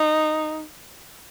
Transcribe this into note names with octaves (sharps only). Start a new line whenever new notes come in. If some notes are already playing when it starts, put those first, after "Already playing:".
Already playing: D#4